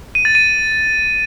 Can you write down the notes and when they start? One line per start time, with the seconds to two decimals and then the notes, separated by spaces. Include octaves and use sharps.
0.15 D#7
0.25 A6
0.35 D#7